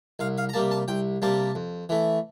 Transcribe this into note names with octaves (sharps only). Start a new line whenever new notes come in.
C2 F5
F5
A#5
C3 G3 A#3 A5
A5
C2 G5
C3 G3 A#3 A5
F2
E3 A3